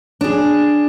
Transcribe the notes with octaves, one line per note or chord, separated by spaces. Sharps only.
D4 G#4